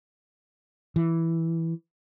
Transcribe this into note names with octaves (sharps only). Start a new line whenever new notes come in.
E3